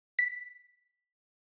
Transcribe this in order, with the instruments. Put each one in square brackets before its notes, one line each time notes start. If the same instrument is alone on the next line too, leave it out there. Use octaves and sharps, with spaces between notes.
[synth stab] B6